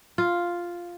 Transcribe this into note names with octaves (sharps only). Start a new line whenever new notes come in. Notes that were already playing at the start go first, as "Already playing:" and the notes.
F4